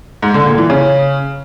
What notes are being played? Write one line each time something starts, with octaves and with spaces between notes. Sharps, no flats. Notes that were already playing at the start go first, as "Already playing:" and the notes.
G#2
D3
A#2
E3
C#3